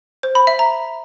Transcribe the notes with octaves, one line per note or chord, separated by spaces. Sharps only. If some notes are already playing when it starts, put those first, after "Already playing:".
C5
B5
E5
A#5